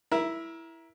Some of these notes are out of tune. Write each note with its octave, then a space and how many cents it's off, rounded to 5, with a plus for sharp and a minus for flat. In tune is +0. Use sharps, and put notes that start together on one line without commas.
E4 +0 A#4 +25